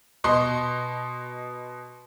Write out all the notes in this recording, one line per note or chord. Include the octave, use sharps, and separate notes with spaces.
B2 D#5 C6